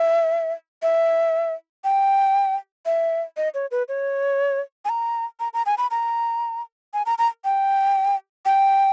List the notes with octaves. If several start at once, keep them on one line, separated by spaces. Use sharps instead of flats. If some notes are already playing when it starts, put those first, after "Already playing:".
Already playing: E5
E5
G5
E5
D#5
C#5
B4
C#5
G#5
A#5
A#5
A#5
G#5
B5
A#5
G#5
A#5
A#5
G5
G5